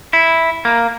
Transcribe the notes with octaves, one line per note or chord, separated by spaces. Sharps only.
E4
A#3